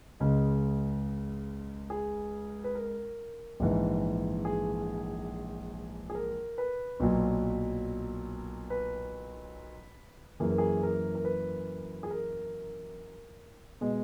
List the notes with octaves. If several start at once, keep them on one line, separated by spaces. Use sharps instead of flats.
C#2 C#3 G#3
G#4
B4
A#4
A#1 G#2 E3
G#4
G#4
A#4
B4
B1 A#2 F#3
B4
F#2 E3 A#3 G#4
A#4
G#4
A#4
A#4
B4
G#4
A#4
B2 G#3